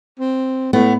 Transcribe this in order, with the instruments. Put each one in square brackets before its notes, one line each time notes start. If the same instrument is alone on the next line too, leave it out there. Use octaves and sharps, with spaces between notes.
[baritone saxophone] C4
[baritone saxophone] A2 [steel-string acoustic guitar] B3